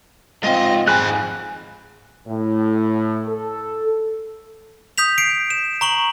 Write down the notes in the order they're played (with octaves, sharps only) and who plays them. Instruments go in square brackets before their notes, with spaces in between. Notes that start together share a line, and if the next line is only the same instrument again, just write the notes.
[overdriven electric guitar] G#2 F4 [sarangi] C4 [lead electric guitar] D#5
[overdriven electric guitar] F2 G#2 [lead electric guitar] G#4 B5 [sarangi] G#5 [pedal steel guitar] F#6
[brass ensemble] A2
A4
[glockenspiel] D#6 G6 B6 F7
C7 D7
E7
A#5 C#6 F#7